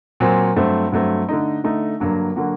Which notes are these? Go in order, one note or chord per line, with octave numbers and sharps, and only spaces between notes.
A#2 F#3 C4
G2 F#3 A3 C4
G2 F#3 A3 C4
D3 A3 D#4
D3 A3 D#4
G2 D3 F#3 A#3 F#4
D3 F#3 A#3 F#4